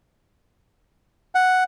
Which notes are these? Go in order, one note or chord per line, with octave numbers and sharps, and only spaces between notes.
F#5